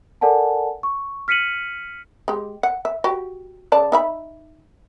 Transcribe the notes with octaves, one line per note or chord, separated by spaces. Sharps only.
A4 A#4 D5 F#5 G#5 A5
C#6
F6 B6 C#7 D#7 F#7
G#3 G4
F#5
E5
F#4 G4
C#3 D5 A5
D#4 E5 B5